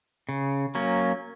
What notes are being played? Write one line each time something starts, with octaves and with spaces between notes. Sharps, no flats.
C#3
F#3 A#3 C#4